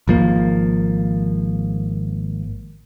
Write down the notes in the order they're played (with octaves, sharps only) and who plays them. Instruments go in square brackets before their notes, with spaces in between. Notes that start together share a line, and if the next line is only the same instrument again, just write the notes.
[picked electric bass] G#1 F3 A#3